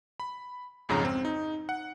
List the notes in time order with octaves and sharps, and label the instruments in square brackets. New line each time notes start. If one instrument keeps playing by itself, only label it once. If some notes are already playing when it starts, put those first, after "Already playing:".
[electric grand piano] B5
B1 F2 G#2 C#3 A#5
C4
D#4
F#5